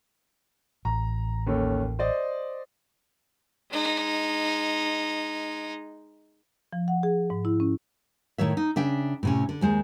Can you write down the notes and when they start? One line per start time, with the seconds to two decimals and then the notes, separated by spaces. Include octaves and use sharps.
0.85 A1 A#5
1.46 D#2 C#4 A4
1.99 C5 D5 D#5
3.71 G#3 D#4
6.73 F3
6.88 F#5
7.03 G#4
7.30 G#2
7.45 E4
7.60 C#4
8.38 A2 D#3 C#5 E5
8.57 D#4
8.76 C#3 D4 E5 G5
9.23 A2 C3 C#4
9.49 D3
9.61 D#2 G#3 C5